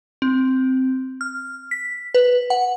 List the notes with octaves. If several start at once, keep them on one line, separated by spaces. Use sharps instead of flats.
C4
F6
B6
B4
F#5